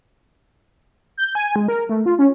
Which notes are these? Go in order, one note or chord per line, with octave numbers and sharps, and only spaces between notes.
G6
G#5
G#3
A#4
A3
F4
C#4